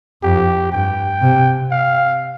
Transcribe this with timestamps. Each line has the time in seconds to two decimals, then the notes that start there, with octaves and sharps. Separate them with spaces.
0.23 F2 G4
0.72 G2 G5
1.22 C3
1.71 F5